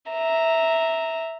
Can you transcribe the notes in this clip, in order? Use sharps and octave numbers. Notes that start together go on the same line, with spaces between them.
E5 A#5